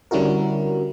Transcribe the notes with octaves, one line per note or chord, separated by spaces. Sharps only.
D3 G3 C#4 E4 F#4 A#4